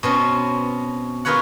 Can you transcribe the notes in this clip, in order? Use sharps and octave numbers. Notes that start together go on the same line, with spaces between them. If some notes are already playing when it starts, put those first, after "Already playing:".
B2 C4 C#4
F4 G#4 A#4 B4 C#5 F#5